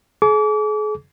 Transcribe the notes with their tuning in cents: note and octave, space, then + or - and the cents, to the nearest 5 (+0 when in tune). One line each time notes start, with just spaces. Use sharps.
G#4 +40 D6 -35